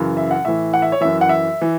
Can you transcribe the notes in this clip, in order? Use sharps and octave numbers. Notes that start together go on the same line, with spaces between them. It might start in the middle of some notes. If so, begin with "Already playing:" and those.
Already playing: F#2 C#3 E3
E5
F#5
A2 E3 E5
F#5
E5
C#5
F#2 E3 E5
F#5
E5
E3